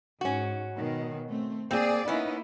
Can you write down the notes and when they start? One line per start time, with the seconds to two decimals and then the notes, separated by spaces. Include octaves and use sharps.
0.21 G#2 C#4 F#4
0.76 B2 D#3
1.29 A3 C4
1.71 A#3 C4 G#4 D5
2.08 A#3 B3 C#4 D#4 E4